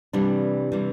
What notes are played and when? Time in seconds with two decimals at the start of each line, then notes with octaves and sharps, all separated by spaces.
0.13 C3 E3 G3 D4
0.72 C3 E3 G3